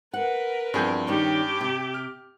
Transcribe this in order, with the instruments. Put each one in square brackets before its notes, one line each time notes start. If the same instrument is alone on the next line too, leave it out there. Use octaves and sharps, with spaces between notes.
[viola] A#4 B4 [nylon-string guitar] F#5
[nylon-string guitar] E2 F3 C4 [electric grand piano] G2 G#4 G6
[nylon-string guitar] D#3 G3 C#4 [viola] G4
[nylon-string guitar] C3
[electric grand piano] F6